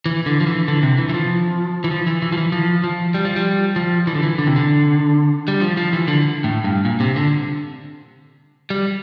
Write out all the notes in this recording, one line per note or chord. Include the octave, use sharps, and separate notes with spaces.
E3
D3
F3
E3
D3
C3
E3
E3
F3
E3
F3
E3
E3
F3
E3
F3
F3
G3
F3
G3
F3
E3
D3
E3
D3
C3
D3
G3
F3
F3
E3
D3
A2
G2
A#2
C3
D3
G3